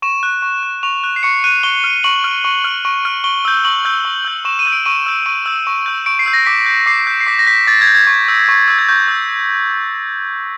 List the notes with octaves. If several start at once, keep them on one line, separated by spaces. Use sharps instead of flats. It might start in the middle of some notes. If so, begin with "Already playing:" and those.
C#6 E7
F#6
C#6
F#6
C#6 F7
F#6
C7
C#6 C#7
F#6 D#7
C#6 G7
F6
C#6 F#7
F6
C#6
F6
C#6
F6
C#6 G7
E6 G6
C#6 F#7
E6 G6
C#6
E6 G6
C#6 E7
D#7
E6 G6
D7
C#6 D#7
E6 G6
C#6 D#7
E6 G6
C#6
E6 G6
C#6 D7
C7
E6 G6
A#6
D6 B6
G6
D6 C7
G6
C7
D6 B6
A#6
G6 B6
D6 A6
G#6
G6
G#6
C#6
E6 G6
C#6
E6 G6
G#6
C#6 G6
E6 G6